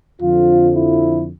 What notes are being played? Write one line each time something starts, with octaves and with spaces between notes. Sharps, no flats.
F2 D3 F3 F4
E4